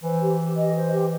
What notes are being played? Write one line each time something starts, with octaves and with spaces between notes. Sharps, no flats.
E3 C5
G4
G4
D#5
C5
G4